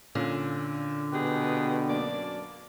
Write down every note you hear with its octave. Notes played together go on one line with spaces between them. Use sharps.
A#2 D3 C#4 F4
B2 G4 G#4 B4
F#2 A#3 D4 D5